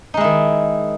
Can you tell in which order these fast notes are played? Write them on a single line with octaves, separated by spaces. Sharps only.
D#4 G#3 E4 D#3